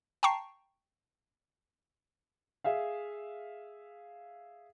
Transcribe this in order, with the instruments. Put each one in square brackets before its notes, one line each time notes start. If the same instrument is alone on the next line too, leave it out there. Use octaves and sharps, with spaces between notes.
[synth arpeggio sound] G5 A5 A#5 C#6 C7
[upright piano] G#4 E5 F5